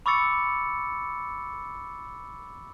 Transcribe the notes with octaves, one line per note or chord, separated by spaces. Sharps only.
B5 C#6 D6 E6 A6 C#7